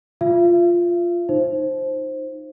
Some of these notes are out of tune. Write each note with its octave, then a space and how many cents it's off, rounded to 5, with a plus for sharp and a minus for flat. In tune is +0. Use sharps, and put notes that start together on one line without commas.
F4 +0 E5 +45
D#4 -5 C5 +10